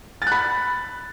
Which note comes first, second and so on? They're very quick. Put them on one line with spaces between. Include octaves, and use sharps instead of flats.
A6 F#6 B5